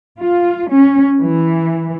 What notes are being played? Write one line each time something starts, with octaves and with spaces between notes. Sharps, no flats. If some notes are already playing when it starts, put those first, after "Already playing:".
F4
C#4
E3